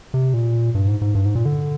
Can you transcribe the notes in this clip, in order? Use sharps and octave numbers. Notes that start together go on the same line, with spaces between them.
C3
A#2
G2
G#2
G#2
G2
G#2
A#2
D3